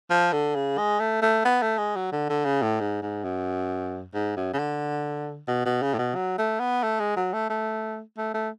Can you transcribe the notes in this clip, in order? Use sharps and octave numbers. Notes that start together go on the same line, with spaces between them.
F3
D3
C#3
G#3
A3
A3
B3
A3
G#3
F#3
D3
D3
C#3
A2
G#2
G#2
F#2
G#2
F#2
C#3
D3
B2
B2
C#3
A2
B2
F#3
A3
B3
A3
G#3
F#3
A3
A3
A3
A3